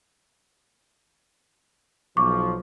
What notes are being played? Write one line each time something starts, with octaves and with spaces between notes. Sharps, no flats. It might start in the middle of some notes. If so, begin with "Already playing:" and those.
B1 F3 C#6 D6